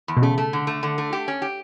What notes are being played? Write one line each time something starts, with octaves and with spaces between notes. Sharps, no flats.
E2
B2
C#3 A3
A3
D3
A3
D3
A3
G4
C#4
G4